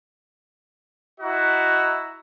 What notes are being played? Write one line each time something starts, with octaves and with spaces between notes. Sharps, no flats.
E4 F#4 D#5 A#5